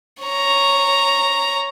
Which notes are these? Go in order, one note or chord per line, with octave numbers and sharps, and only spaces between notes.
C#5 A#5